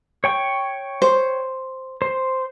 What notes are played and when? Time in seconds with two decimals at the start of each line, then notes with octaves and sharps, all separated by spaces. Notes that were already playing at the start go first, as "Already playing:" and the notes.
0.24 C#5 G5 C#6
1.02 C5
2.02 C5